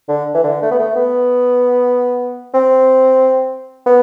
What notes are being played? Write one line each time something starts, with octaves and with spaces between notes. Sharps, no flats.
D3
E3
D3
A3
B3
A3
B3
C4
B3